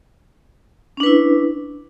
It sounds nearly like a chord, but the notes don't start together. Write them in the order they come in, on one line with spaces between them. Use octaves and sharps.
C#4 D4 B4 E4